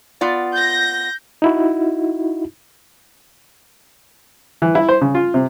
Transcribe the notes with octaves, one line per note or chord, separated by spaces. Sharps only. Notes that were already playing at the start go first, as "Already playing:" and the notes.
B3 F4 D5
G6 A#6
D#4 E4 F#4
E3
E4
C5
C#3
F4
C3